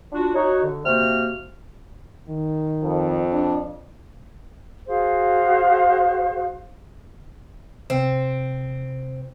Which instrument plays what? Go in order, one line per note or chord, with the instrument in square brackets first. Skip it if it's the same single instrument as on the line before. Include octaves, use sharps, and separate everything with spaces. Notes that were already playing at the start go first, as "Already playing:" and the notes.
[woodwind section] D4 F4 F#4
D#4 F#4 C#5
D3
C3 A#3 F#4 C5 F6
[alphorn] D#3
[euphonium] F2
[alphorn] D4
[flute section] F#4 G#4 C5 F5
[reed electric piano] C3 [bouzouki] C4